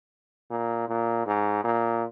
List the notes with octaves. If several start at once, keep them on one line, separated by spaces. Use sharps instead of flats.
A#2
A#2
G#2
A#2